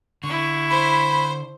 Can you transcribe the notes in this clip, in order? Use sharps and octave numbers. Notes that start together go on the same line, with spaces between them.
D3 E4 C#6
C5 B5